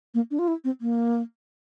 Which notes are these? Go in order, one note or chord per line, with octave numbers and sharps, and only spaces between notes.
A#3
D4
F4
E4
C4
A#3